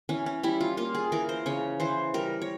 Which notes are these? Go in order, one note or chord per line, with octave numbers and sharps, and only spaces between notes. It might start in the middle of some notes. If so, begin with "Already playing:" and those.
E3 C#4
C#4
G3 E4
F4
A#3 F4
G#4
E3 A#4
C5
C#3 C#5
E3 C5
G3 A#4
C#5